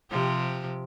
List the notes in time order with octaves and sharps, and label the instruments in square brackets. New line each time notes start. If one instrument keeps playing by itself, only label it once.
[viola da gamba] C3 F3 G4